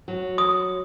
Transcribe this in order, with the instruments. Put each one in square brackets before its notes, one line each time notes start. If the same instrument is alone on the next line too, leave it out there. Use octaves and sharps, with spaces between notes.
[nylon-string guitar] F#3
[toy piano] D#6